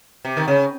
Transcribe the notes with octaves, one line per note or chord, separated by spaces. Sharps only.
C3
D#3
C#3